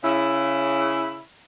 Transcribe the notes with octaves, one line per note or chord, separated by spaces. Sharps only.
C#3 E4